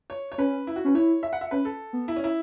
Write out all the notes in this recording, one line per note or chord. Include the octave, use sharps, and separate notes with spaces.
C#5
C#5
C#4 B4
E4
F#4
C#4 B4
E4 C#5
E5
F#5
E5
C#4 B4
A4
B3
E4
C#4
E4